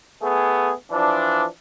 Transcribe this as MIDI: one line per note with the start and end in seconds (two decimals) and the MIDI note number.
0.22 0.71 57
0.22 0.71 59
0.22 0.71 68
0.92 1.44 52
0.92 1.44 53
0.92 1.44 62